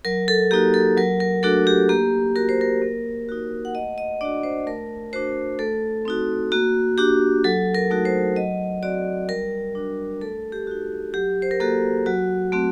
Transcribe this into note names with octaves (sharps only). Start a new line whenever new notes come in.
F#3 A#4
A4
A#3 D#4 F#4 G4
A4
F#3 A#4
A#4
A3 D4 F#4 A4
G4
A#3 G4
F#4 A#4
C5
A#4
A#3
D#4 F#4
F#5
A3 D#5
D#5
D4 F#4 D5
C5
A3 A#4
D4 F#4 C5
A3 A4
C4 D#4 F#4
A#3 F#4
D4 F#4 G4
F#3 A4
A#4
A3 D#4 F#4
C5
F#3 D#5
C4 F#4 D5
G3 A#4
D4 F#4
A3 A4
G4
D#4 F#4
F#3 G4
C5
A#4
A#3 F#4 A4
F#3 F#4
A3 C4 F#4